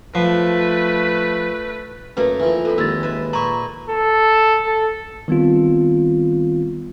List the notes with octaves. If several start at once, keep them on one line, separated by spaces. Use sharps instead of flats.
F3 A3 B4
F#2 A3 A#3 A#4 B4
E3 F3
F2 A4 B5
D#2 G#3 E6 A6
B4 E5
A#2 A#5 B5 C#6
A4
A4
D#3 G3 B3 C4 F4